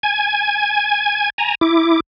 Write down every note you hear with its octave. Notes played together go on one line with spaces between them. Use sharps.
G#5 G#6
G#5 A#5
E4 D6